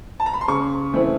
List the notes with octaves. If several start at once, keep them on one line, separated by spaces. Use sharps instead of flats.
A5
A#5
B5
C6
C#3 C#6
E3 A3 C4 E4